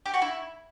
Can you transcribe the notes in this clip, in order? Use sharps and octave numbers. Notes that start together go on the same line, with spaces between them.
G4
F#4
E4